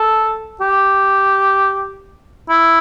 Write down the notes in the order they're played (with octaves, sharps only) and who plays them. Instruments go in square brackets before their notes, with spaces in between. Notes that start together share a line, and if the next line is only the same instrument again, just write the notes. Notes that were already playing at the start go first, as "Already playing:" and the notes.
Already playing: [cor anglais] A4
G4
E4